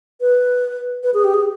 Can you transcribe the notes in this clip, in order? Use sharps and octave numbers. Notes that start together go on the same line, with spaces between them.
B4
B4
G#4
G4
G#4